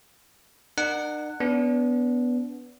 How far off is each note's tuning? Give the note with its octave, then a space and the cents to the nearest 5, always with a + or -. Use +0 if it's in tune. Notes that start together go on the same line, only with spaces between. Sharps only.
D4 +45 A#4 +0 F#5 +0
B3 +0 D4 -30